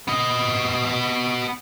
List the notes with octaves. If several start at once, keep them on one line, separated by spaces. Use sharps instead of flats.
B3 D#5